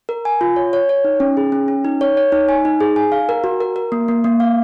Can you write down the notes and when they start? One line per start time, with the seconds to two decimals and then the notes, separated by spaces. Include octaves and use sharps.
0.09 A#4
0.25 G#5
0.41 F4
0.56 C#5
0.73 C#5
0.89 C#5
1.04 D#4
1.20 C#4
1.37 G#4
1.52 C#4
1.68 C#4
1.85 D#4
2.01 C#5
2.17 C#5
2.32 D#4
2.49 G#5
2.65 D#4
2.81 G#4
2.96 G#5
3.12 F5
3.29 A#4
3.44 F#4
3.61 A#4
3.76 A#4
3.92 A#3
4.08 A#3
4.24 A#3
4.40 F5